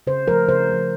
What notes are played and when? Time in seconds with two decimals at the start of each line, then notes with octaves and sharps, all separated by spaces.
0.07 C#3 C5
0.28 F3 A3 A#4
0.49 C#3 C5
0.69 F3 A3